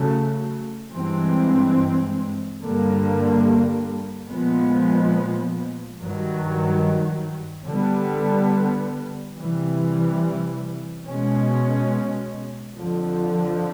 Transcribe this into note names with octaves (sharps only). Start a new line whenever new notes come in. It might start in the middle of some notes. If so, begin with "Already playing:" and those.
Already playing: C#3 F#3 A3
G2 E3 G#3 C4
G2 D3 G3 A#3
A#2 F3 G#3 B3
G2 D#3 F#3
D3 G3 B3
C3 E3 G3
B2 G#3 C#4
F2 D3 F3